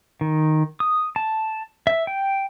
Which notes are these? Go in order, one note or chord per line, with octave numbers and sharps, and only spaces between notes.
D#3
D#6
A5
E5
G5